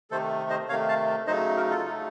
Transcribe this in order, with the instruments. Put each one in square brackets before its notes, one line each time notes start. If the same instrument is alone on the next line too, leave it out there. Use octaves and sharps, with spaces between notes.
[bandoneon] C3 D#3 A3 A4 C5
C5 D#5
C3 D#3 A3 C#5 F5
F5 A5
C#3 F#3 A3 D#4 C5 D#5
F#4 A#4
F4 A4
C#3 F#3 A3 D#4